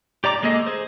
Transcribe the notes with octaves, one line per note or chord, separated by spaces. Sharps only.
G4 D5 A#5 D6
G#3 A#3 G#4 A4 D#5
G#4 C5